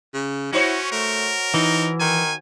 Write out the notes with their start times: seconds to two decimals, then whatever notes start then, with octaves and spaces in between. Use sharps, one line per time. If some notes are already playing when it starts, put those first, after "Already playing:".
0.14 C#3
0.52 C#4 E4 F#4 C5 C#5
0.92 A3 A#4
1.54 E3 D#4
2.00 D#3 G#5